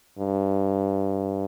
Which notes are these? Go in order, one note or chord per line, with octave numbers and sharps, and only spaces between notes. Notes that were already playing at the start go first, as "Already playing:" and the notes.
G2